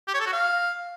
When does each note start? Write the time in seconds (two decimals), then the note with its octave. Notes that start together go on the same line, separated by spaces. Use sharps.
0.08 G4
0.14 C#5
0.20 A4
0.26 F#4
0.33 F5